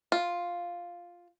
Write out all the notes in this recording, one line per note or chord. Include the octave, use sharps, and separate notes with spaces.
F4